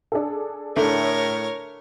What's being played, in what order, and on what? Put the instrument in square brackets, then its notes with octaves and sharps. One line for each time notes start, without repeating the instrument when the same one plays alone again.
[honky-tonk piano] D4 G#4 A4
[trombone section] A2 [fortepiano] D3 A3 [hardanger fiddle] A#4 C#5